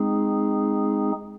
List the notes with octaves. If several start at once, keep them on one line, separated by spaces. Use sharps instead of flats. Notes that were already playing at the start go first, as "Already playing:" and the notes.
Already playing: G#3 C4 D#4 G#4